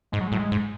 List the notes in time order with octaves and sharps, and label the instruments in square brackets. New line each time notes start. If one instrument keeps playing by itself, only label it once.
[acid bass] G#2 [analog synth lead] G#3
[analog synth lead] F#3
G#3
[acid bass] A2 [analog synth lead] F#3
[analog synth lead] G#3
[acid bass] G#2